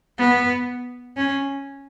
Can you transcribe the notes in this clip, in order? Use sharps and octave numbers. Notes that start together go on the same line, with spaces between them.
B3
C#4